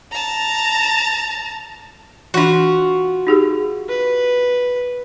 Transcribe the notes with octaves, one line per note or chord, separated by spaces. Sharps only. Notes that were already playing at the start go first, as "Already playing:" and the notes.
A5 A#5
E3 D4 F4 F#4
D#4 G4 G#4
B4